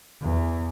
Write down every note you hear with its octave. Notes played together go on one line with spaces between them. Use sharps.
E2